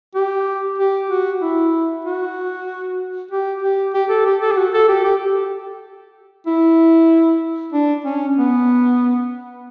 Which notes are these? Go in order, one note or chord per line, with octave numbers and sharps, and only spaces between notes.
G4
G4
F#4
E4
F#4
G4
G4
G4
A4
G4
A4
G4
F#4
A4
G4
G4
E4
D4
C#4
B3